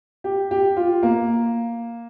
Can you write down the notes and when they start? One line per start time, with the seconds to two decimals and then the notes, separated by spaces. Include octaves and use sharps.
0.24 G4
0.51 G4
0.77 F4
1.03 A#3